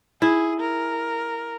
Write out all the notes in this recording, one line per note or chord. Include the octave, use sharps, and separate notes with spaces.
E4 G#4
A#4